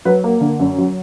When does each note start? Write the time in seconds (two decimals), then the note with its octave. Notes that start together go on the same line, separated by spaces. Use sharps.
0.05 F#3 B4
0.24 A#3
0.41 D3
0.60 F#2
0.78 F#3